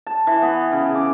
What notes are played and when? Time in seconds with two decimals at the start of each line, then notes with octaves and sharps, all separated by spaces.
0.07 A5
0.27 E3
0.42 B3
0.72 C#3
0.95 D6